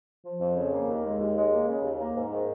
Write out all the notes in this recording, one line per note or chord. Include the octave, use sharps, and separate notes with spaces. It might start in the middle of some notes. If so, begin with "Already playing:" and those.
F3
F2
C#3
A#3
D#2
G#3
D#2
G#3
A#3
C#3
D#2
A#3
G#2
D#3